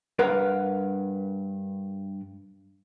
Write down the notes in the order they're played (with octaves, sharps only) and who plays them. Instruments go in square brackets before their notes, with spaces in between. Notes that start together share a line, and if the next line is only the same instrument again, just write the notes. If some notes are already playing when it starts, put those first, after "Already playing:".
[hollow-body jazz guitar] G2 A#4 B4 F5 F#5